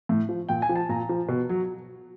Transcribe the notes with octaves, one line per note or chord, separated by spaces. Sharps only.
A2
F3
A#2 G5
G#5
F3
A5
A#2 A#5
F3
B2
F#3